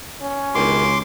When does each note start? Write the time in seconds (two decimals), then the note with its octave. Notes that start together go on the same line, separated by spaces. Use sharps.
0.22 C#4
0.55 C#2 G2 B2 D#3 C6 D6